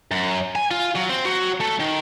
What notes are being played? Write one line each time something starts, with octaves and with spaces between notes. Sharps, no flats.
F#2
G#5
F4
F#3
C4
F#3
A3
D#3